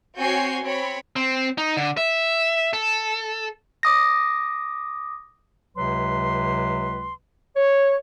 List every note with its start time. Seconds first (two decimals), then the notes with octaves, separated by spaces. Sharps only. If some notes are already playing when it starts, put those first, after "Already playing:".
0.18 C4 F#4 C#5 G#5 G6 C7
0.63 C4 C#5 B5
1.16 C4
1.58 D#4
1.77 D3
1.97 E5
2.73 A4
3.83 D6 D#6 A#6
5.76 C#2 C3 F#3 B4 C6
7.56 C#5